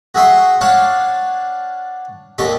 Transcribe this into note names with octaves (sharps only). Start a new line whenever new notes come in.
F#4 G#4 E5 C6 C#6
D4 C#5 F5 F#5 A5
D#2 D3 D#4 G4 C#6